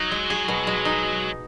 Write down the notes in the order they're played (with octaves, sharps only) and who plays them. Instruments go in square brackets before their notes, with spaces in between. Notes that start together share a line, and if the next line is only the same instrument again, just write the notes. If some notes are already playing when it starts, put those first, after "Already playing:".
Already playing: [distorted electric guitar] F#3 [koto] D#4
[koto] G#3
G#4
B2
G#3
D#4